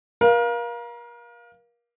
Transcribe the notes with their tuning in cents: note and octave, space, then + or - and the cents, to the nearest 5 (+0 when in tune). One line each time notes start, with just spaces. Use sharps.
A#4 +35 F5 +0